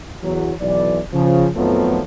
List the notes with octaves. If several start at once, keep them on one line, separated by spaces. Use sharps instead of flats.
E2 F#3
B1 E3 D5
C#3 F3
F2 D#3 F3 F#3 A3 B3